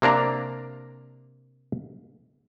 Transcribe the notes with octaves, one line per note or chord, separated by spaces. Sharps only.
C3 A#3 D4 A#5